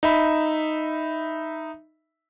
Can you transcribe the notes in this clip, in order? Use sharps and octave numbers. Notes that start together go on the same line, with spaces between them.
D#4 E5 B5